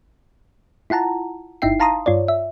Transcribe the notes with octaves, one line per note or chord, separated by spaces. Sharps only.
E4 F4 F#5 A5 A#5
G1 D#4 E4 E5 G5 C7
F5 A5 A#5 C6 D#6
G2 F4 C#5 D5
E5